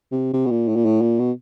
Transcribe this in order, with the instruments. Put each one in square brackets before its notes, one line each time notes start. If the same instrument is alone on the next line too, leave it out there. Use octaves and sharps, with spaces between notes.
[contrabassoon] C3
C3
B2
A#2
A2
A#2
A2
A#2
B2